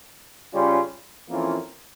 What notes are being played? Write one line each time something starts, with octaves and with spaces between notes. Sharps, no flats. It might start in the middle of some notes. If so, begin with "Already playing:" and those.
C#3 G3 C#4 F4
F2 E3 A#3 C#4 F4